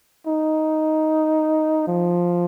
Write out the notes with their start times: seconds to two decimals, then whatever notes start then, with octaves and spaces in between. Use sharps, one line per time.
0.27 D#4
1.88 F3